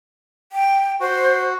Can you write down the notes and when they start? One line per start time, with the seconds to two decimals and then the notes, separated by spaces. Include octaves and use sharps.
0.52 G5
1.00 F#4 C5